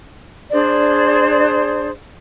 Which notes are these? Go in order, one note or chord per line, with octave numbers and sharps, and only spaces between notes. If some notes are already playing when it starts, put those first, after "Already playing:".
D4 G#4 C5 D5